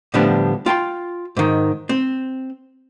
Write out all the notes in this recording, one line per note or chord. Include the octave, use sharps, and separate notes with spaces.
A2 D3 F3 G3 B3 D4
F4 G5 A5 C6
G#2 D#3
C4